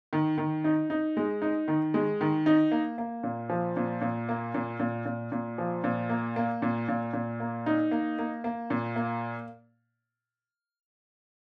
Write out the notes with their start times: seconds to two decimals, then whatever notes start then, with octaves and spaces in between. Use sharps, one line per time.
0.13 D#3
0.38 D#3
0.64 D#4
0.90 D#4
1.17 G#3
1.42 D#4
1.68 D#3
1.94 G#3
2.21 D#3
2.46 D#4
2.71 A#3
2.98 A#3
3.23 A#2
3.49 F3
3.77 A#2
4.01 A#2
4.29 A#3
4.54 A#2
4.80 A#2
5.05 A#2
5.32 A#2
5.58 F3
5.84 A#2
6.09 A#3
6.36 A#3
6.62 A#2
6.88 A#2
7.13 A#2
7.40 A#3
7.66 D#4
7.91 A#3
8.19 A#3
8.44 A#3
8.70 A#2
8.96 A#3